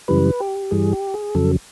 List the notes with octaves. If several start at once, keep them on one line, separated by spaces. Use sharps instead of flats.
F#2 C#3 E3 G3 B4
G4
G2 E3 G3 G#4
G4
G#4
F2 C#3 F#3 A4